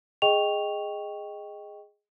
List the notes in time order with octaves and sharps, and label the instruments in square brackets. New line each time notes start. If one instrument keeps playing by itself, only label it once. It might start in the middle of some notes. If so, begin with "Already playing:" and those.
[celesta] G#4 D#5 G5 C#6 F7